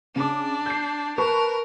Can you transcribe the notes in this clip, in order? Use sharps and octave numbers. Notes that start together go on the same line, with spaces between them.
C#3 D4 D6
G6 C7
A#4 B4 A5 C#6